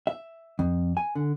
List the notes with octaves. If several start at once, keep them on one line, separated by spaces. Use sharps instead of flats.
E5
F2
G#5
D3